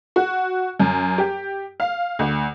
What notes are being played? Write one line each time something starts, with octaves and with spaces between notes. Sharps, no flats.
F#4
F#2
G4
F5
D2